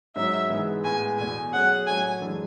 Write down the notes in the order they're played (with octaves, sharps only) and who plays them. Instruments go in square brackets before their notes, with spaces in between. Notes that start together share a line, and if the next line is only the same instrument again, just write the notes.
[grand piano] G#2 F#3 C#4 [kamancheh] E5
[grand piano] G#2 E3 G#3 B3
[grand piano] A2 G#3 B3 [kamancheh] G#5
[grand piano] E2 B2 A3 [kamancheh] G#5
[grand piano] F#3 A3 C#4 G#4 [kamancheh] F#5
[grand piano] A2 F#3 C#4 F#4 A4 [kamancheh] G#5
[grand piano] F#2 E3 G#3 D4